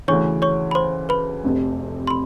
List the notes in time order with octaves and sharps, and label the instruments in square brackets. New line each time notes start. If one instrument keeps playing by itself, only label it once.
[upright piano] D2 C#3 E3 [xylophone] C#5 C#6
[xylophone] C#5 C#6
B5
C5 C6
B4 B5
[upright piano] F1 F2 C3
[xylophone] C6
B5